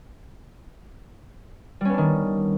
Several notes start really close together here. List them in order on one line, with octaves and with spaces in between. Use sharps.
G3 C#4 B3 D4 D#3